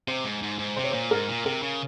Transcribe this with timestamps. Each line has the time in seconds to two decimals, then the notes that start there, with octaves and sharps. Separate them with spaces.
0.08 C3 C5
0.24 G#2
0.43 G#2
0.59 G#2
0.76 C3 C5
0.84 C#5
0.91 A#2 C5
1.11 G#2 A#4
1.28 A#2
1.45 C3 A#4
1.62 C#3